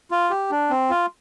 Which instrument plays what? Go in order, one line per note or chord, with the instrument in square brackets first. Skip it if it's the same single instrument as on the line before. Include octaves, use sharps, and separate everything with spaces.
[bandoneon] F4
G4
D4
C4
F4